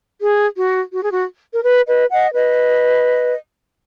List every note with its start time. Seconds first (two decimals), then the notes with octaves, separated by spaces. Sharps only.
0.21 G#4
0.56 F#4
0.92 F#4
1.03 G#4
1.12 F#4
1.53 A#4
1.64 B4
1.87 B4 D#5
2.11 D#5 F#5
2.34 B4 D#5